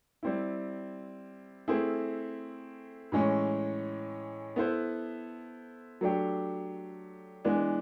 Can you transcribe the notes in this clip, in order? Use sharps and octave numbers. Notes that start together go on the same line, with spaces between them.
G3 C4 E4
A3 C4 E4 G#4
A2 E3 G#3 C#4
B3 E4 A4 C5
F#3 A3 D4 G4
E3 G#3 B3 D4